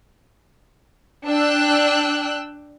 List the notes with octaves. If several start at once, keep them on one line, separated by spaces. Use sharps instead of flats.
D4 G5 E6 F#6